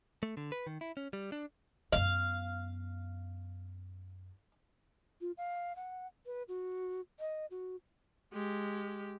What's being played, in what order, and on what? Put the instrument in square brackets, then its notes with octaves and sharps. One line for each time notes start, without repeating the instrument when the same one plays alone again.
[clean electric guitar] A3
D3
B4
D#3
E4
C#4
G3
D4
[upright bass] F#2 B3 [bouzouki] F5
[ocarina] F4
F5
F#5
B4
F#4
D#5
F#4
[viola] G#3 G4